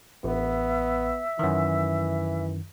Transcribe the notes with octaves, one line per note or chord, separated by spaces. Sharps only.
A1 B3 E5
F#2 D#3 E3